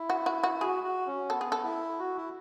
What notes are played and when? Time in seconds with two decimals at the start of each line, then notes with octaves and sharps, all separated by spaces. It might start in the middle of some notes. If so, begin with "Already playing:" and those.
Already playing: E4
0.10 F#4
0.26 F#4
0.43 F#4
0.61 F#4 G#4
0.84 F#4
1.07 C#4
1.30 B3 A4
1.41 G#4
1.52 A4
1.64 E4
1.99 F#4
2.16 E4